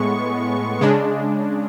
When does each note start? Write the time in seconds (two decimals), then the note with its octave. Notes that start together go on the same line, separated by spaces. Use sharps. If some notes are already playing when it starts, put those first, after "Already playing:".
Already playing: A2 G#3 B3 C#6
0.81 C#3 G#3 D4